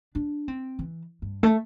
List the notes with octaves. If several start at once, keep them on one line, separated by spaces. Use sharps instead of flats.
D4
C4
E3
G2
A3